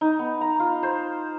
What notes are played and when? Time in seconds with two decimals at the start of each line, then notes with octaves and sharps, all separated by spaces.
0.01 D#4
0.19 B3
0.41 A#5
0.60 F4
0.83 C5